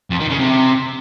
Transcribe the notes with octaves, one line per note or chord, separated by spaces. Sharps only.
F2
D#3
C#3
C3